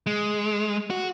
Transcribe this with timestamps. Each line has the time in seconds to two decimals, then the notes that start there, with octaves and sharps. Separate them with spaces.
0.06 G#3
0.90 F#4